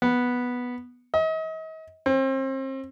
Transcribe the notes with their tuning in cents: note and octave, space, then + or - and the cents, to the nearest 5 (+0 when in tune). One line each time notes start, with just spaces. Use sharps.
B3 -5
D#5 +40
C4 +35